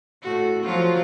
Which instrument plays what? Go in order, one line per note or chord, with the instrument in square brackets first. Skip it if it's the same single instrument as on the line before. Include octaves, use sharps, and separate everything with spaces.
[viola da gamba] A2 F#4
F3 F#3 F4